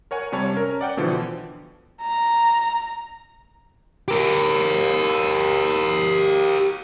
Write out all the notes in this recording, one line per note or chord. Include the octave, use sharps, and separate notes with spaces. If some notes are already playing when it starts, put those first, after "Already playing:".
A#4 C#5 F#5 G#5
C3 G3 C#5 A5
C#4 A#4
D5 F#5 G5
B2 D3 E3 F3
A#5
G4 A#4